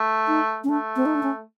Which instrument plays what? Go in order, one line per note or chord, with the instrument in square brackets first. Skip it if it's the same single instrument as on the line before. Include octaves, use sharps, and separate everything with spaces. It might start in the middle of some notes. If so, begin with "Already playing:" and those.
Already playing: [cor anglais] A3
[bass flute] D#4
C#4
[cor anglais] A3 [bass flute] D4
[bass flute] C4
D#4
D4
C#4